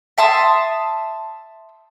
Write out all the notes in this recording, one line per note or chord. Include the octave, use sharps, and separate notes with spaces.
E5 A5 C6 D#6